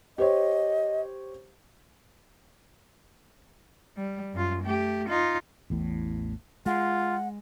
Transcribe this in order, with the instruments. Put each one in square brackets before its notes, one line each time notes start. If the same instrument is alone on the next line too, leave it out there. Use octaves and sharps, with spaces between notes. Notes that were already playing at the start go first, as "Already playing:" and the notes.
[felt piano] G4 C5 C#5 [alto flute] D#5
[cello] G3
F#2 F4
A3 G4
D#4 F4
[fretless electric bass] A1 E2 A2
[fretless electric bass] G#3 [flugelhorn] F4 [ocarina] F#5